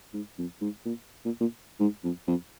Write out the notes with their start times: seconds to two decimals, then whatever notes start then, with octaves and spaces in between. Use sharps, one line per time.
0.14 G#2
0.38 F2
0.61 G#2
0.85 A#2
1.25 A#2
1.41 A#2
1.80 G#2
2.04 F2
2.27 F2